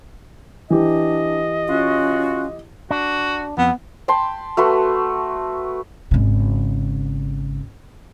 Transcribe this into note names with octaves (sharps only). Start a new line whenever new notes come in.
E3 D4 G4 D#5
C#4 F4 F#4
D4 F#4
F2 B3
G5 A5 B5 C6
A3 F#4 B4 C6
G#1 C#3